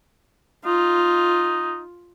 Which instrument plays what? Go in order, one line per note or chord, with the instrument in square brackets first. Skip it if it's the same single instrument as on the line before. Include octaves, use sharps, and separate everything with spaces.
[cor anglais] D#4 [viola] F4